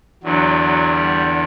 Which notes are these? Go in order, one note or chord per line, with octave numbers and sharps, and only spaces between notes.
E2 D3 F#3
F#3
G3